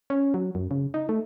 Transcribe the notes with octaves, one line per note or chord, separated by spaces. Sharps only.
C#4
F#3
F#2
C#3
D#4
A3